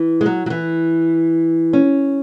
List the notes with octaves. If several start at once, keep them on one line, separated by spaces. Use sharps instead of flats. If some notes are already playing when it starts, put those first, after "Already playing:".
Already playing: E3
G#3
F#3
F#3
E3
C#4